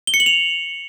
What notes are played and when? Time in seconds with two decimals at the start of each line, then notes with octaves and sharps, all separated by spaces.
0.07 G7
0.14 C#7
0.20 F#7
0.26 F7